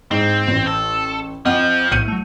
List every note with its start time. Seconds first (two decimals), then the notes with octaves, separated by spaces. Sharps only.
0.11 G#2 C4
0.48 A1
0.67 A4
1.45 F2 F3 D#5 F#5 F6
1.92 B1 A2 E4 G6 C#7 D#7
2.08 F#3 A3